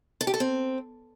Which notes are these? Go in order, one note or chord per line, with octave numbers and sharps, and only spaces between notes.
A4
G4
A4
C4